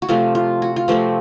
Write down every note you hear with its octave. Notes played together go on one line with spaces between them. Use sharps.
F#4
C3 F3 A3 C4 F4
F4
F#4
F4
C3 F3 A3 C4 F#4